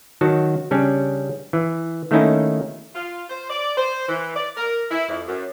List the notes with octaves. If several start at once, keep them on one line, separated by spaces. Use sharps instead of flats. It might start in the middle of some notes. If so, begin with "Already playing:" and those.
D#3 F#3 F#4 A5
C#3 G3 C#4 D4
E3
D#3 A3 A#3 C#4 D#4 E4
F4
C5
D5
C5
E3
D5
A#4
E4
F2
F#2